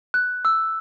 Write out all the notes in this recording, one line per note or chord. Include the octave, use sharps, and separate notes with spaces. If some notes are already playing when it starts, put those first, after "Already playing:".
F#6
E6